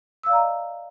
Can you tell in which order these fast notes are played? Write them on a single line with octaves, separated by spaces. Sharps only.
E6 F5 D5 A#5 D#5